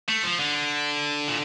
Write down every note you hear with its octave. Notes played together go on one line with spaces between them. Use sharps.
A3
F3
D3
A#2